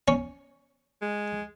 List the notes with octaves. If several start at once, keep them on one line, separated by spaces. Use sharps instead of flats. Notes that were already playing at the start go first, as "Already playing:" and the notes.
C#4
G#3